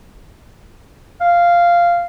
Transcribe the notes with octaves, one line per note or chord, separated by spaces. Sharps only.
F5